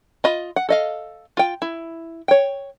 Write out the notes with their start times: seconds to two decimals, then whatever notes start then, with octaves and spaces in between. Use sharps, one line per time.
0.24 F4 D#5 B5
0.56 F#5
0.69 A4 D#5 F5
1.37 F4 G5
1.62 E4
2.28 C#5 G5